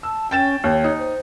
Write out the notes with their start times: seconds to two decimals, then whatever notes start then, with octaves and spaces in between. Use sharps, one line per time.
0.03 A5 E6
0.31 C#4 G5 A6 E7
0.64 D#2 C#5
0.84 D#4
0.99 C5